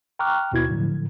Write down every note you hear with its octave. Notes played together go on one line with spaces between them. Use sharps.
G5 A#5 C#6 D6 F6 F#6
D#2 B2 E4 G#6
A2 D3 F3 F#3